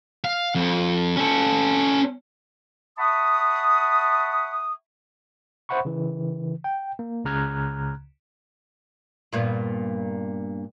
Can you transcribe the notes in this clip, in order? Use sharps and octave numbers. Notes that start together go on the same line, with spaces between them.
F5
F2
C#4 A4
E5 F#5 A5 B5 C#6 D#6
C5 E5 F#5 B5 C#6
C#3 E3
G5
A#3
C#2 C#3 A#5 F6 F#6 G#6
G2 A#2 B3